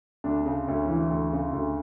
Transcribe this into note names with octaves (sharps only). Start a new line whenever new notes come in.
D2 D4
C#3
D2 C#4
E3
D2
C#3
D2